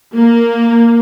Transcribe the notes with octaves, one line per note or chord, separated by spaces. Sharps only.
A#3